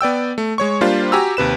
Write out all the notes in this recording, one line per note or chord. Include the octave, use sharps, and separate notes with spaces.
B3 D5 G5 E6
A3
G#3 C#5 C#6
G3 A#3 D4 F4 C5
F#4 G4 G#5 A#5 E6
D#2 C3 B4 E7